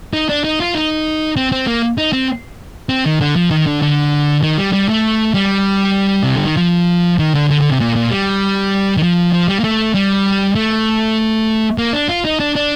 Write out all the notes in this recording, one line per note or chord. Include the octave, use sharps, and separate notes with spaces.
D#4
D4
D#4
F4
D#4
C4
C4
A#3
D#4
C4
C4
D#3
D3
F3
D#3
D3
D3
D#3
G3
G3
A3
G3
C3
D3
D#3
F3
D#3
D3
D3
D3
C3
A#2
A#2
G3
D#3
F3
F3
G3
A#3
A3
G3
A3
A#3
D4
F4
D#4
D4
D4